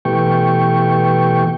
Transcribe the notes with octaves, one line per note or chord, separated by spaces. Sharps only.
B2 E3 A3 G4 G5 C#6